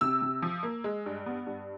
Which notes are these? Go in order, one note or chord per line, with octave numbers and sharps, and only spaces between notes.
C3 E6
C3
F3
A#3
G#3
G2
B3
G2